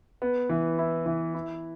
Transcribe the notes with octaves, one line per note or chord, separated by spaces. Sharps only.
B3
E3
E4
E3
E4